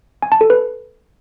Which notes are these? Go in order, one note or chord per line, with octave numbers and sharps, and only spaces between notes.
G#5
A5
A4
B4